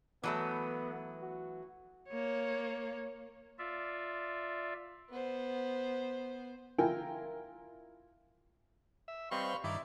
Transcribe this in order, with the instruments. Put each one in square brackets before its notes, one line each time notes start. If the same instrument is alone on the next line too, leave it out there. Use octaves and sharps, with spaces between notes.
[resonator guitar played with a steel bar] E3 F#3 A3 [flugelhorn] B3
[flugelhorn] F#4
[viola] A#3 C#5
[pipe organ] F4 D5 E5
[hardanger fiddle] B3 C5
[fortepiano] E4 F4 A#4 G5 G#5
[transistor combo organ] E5
[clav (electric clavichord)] G3 C4 D#5 [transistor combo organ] B4 C5 F5 [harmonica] C6 C#6
[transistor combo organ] G2 D#3 [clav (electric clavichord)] E4 [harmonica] D5